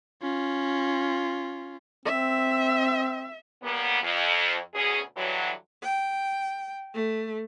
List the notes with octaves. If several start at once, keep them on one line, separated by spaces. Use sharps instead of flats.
C#4 F4
C4 E5
C#3 G3 A#3 B3
F2
D2 B2 C#4 G#4
G2 D3 E3 F#3
G5
A3